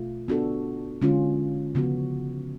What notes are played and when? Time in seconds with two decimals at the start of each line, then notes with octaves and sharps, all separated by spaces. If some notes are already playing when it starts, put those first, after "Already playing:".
Already playing: B2 A3 F4
0.28 B3 D4 F#4 A4
1.02 D3 G#3 C#4 F4
1.75 C#3 F3 B3 F#4